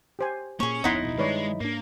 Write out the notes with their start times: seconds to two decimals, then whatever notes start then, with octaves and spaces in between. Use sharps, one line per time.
0.19 G4 C5 G#5
0.60 A#2 A#3 C#4 G#4 C#6
0.84 D1 F2 B3 D#4 E4 D#5 F#5 C6
1.04 B1
1.19 G2 D#3 G#3 B4 C#5 D5
1.61 G#2 A#3 D4